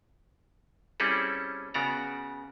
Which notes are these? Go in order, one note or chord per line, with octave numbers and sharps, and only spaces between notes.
G3 C4 C#4 E4 G#4 A4
C#3 B3 F#4 D5 A#5